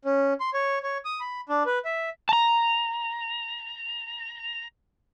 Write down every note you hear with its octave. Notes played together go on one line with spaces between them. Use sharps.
C#4
C6
C#5
C#5
D#6
B5
D4
B4
E5
A5 A#5